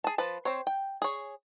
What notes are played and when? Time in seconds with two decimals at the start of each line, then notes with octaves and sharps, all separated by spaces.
0.04 G#4 A5
0.18 F3 B4 A5
0.45 C4 C5 C#5
0.67 G5
1.02 G#4 C#5